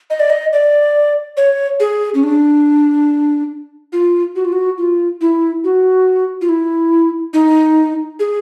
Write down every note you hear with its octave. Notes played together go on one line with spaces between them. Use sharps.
D#5
D5
D#5
D5
C#5
G#4
C#4
D4
F4
F#4
F4
F#4
F4
E4
F#4
F4
E4
D#4
G#4